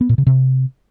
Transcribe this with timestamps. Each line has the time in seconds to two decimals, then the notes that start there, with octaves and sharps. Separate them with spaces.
0.01 B3
0.09 A#2
0.18 C#3
0.27 C3